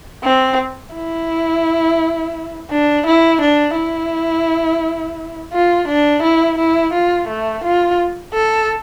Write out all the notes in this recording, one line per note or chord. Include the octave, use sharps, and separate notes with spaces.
C4
E4
D4
E4
D4
E4
F4
D4
E4
E4
F4
A3
F4
A4